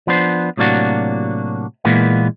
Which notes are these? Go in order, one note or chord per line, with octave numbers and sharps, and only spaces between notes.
F3 B3 D4 C5
A2 C3 F#3 A#3 D4 F#4
A#2 E3 G#3 A#3 B3